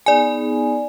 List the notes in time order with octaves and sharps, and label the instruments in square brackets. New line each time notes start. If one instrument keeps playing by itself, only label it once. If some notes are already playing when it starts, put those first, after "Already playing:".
[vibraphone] B3 D#4 G#4 [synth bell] D5 G#5